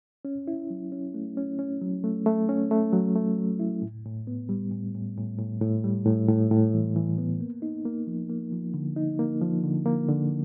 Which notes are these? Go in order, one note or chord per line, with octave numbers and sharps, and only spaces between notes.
C#4
E4
F#3
C#4
A3
C#4
C#4
F#3
A3
A3
C#4
A3
F#3
A3
F#3
E4
A2
A2
B3
G3
A2
A2
A2
A2
A2
G3
A2
A2
A2
E3
E3
B3
A#3
D#4
A#3
F3
A#3
F3
D3
D#4
A#3
F3
D3
A#3
D3